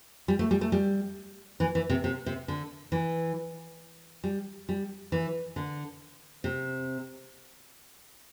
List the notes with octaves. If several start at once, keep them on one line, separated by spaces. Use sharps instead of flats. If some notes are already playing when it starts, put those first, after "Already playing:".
G3
A3
G3
A3
G3
E3
E3
C3
C3
C3
D3
E3
G3
G3
E3
D3
C3